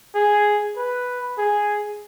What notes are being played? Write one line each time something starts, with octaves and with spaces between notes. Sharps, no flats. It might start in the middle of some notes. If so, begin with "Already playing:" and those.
G#4
B4
G#4